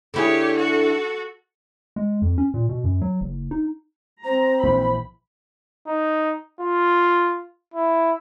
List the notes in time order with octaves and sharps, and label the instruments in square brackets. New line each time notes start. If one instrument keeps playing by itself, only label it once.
[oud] D3 E4 G#4 [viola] G4 C#5
[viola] F#4 A4
[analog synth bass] G#3
F2
C#4
A#2
B2
F#2
F#3
F#1
D#4
[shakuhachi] C4 [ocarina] C5 [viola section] A#5
[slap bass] A#1 E3 [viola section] B5
[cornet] D#4
F4
E4